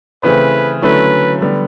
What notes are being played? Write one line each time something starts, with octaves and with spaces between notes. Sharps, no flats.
C#3 E3 A3 C4 B4
D3 F#3 A3 C#4 E4 B4
D3 G3 B3